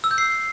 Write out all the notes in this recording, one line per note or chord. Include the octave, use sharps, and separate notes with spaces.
E6
G6
C7